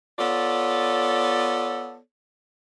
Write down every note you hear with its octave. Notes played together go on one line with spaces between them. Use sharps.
B3 F4 A4 C#5 D5